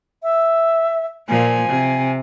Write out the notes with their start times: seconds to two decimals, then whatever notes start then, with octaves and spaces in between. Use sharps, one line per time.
0.23 E5
1.29 A#2 F3 G#5
1.69 C3